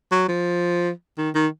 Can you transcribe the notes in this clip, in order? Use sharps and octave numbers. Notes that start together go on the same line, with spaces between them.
F#3
F3
D#3
D#3